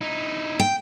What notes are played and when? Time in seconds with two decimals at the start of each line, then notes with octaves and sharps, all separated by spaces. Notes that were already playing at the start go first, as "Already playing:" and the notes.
0.01 D#4 E4
0.60 G5